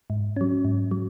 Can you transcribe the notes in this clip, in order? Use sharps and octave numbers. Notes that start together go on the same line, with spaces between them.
G#2
F#3 C#4
G#2
F#3